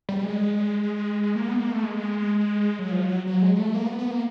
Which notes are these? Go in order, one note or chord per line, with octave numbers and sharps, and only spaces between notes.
G3
G#3
A#3
B3
A#3
A3
G#3
F#3
F3
F#3
F#3
G#3
A3
A#3
B3
B3
A#3